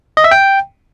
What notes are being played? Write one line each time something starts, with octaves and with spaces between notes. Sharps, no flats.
D#5
E5
G5